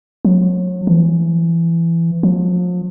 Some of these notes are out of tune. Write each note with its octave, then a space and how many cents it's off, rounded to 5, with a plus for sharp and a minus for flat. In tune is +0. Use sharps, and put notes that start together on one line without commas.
F#3 -35
E3 +20
F3 +40